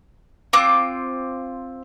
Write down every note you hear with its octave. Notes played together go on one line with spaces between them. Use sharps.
C4 F4 D6 F#6